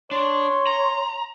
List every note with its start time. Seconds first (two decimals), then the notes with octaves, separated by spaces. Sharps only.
0.11 D4 C#5 C6
0.67 A#5